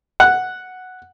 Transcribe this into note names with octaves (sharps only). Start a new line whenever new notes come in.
F#5